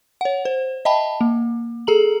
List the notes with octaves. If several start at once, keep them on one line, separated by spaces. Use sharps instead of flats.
C#5 F#5
C5
D#5 E5 G5 A5 B5
A#3
G#4 A4 A#5 F#7